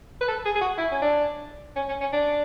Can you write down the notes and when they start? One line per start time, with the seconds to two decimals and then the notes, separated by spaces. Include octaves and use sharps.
0.21 B4
0.28 A4
0.45 G#4
0.56 G#4
0.61 F#4
0.78 E4
0.92 C#4
1.02 D4
1.76 C#4
1.88 C#4
2.01 C#4
2.13 D4